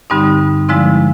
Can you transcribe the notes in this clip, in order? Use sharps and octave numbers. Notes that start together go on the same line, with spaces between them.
G2 D3 G3 C4 D#4
D3 F3 G#3 C4 E4